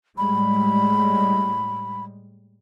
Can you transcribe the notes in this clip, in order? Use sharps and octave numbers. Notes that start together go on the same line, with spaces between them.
A2 G3 G#3 B5